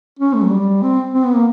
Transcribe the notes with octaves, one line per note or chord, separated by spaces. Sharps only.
C#4
A3
F#3
G3
C4
C4
B3
A#3